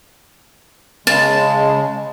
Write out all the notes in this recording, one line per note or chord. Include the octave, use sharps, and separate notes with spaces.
C#3 G#3 A5